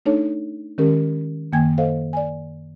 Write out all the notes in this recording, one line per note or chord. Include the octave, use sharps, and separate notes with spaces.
A3 D4 D#4 A4 C#5 A5
D#3 G#3 C#4 G4 A#4
F#2 D#3 A#3 G5 G#5 G#6
A4 C5 D#5 F5 F#5
D5 G#5